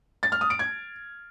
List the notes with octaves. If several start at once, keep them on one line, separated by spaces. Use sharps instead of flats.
A6
F6
D#6
D7
G#6